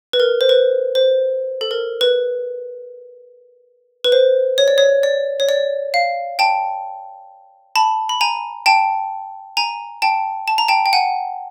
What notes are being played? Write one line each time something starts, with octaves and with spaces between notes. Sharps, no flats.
B4
A#4
C5
B4
C5
A4
A#4
B4
B4
C5
C#5
D5
C#5
D5
C#5
D5
F5
G5 A5
A5 B5
B5
G#5 A#5
G5 A5
G#5 A#5
G5 A5
A5
A#5
G5 A5
G5
F#5 G#5